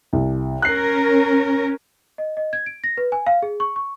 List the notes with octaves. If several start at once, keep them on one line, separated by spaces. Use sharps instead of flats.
C2
C#4 A#4 F#6 C7
D#5
D#5
G#6
D7
A#6
B4
G#5
F5
G#4
C#6
C#6